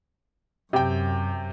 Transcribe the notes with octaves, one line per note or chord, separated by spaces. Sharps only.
F#2 C3 G5